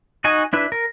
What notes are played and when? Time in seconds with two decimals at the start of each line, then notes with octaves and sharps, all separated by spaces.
0.24 D#4 F#4 D#5 G#5
0.53 D4 E4 B4
0.72 A#4